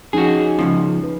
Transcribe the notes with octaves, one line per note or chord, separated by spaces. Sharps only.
F3 C#4 D#4 F#4 G#4
C#2 G2 F3 C#4
B4